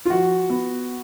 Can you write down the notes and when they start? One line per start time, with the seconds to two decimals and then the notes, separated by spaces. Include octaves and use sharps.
0.05 F4
0.10 F3 F#4
0.50 B3